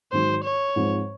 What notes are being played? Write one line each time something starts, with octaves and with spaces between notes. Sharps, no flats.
G#2 D#3 F#3 C5
C#5
G#2 F3 C4